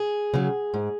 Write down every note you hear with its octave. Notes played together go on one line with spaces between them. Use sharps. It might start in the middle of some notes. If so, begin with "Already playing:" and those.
Already playing: G#4
C#3 F#3
G#2